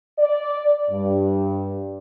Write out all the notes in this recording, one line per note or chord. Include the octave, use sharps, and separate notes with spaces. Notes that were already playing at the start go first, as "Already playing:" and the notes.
D5
G2